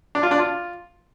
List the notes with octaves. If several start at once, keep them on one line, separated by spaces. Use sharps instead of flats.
D4
F4
D4
F4